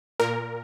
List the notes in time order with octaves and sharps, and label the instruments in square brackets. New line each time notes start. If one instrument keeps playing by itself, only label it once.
[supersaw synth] A#2 A#4